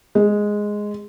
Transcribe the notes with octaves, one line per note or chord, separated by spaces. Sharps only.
G#3